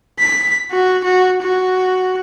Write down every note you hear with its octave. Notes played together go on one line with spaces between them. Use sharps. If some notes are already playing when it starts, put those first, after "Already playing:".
B6
F#4
F#4
F#4